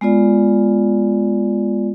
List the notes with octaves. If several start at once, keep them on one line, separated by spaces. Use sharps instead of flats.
G#3 B3 F4 D5